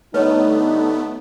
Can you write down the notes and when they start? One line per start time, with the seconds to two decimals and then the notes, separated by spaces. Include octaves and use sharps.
0.14 D3 G3 A3 B3 D#4 B4 C#5 D#5